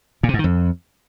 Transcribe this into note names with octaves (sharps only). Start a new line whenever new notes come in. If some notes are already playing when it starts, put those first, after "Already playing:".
A#2
C3
G#2
D#3
F2